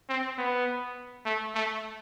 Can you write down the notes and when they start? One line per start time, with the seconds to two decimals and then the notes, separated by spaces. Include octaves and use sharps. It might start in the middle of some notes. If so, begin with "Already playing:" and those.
0.09 C4
0.38 B3
1.25 A3
1.55 A3